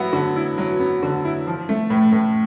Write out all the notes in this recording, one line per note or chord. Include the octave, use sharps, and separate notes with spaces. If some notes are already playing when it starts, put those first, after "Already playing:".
Already playing: F#3 B3 E4
D3
E4
F#3
B3
D3
E4
F3
A3
A2
A2